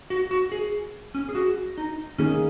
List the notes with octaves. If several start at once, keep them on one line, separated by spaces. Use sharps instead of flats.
F#4
F#4
G#4
C#4
G#4
F#4
D#4
D#3 A#3 C#4 D#4 G#4